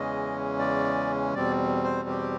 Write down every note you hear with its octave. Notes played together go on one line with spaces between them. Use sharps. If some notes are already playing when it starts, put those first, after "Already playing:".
Already playing: E2 C#3 E3 G#3 C#4 D#5
D5
E2 B2 G3 C4 D5
C5
G4